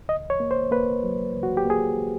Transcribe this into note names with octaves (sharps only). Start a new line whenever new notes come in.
C#2 D#5
C#5
A#3
C5
A#3 B4
F#3
C#2
F#4
G4
A#3
G#4